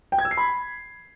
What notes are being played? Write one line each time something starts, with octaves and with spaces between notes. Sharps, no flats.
G5
G#6
E6
C7
B5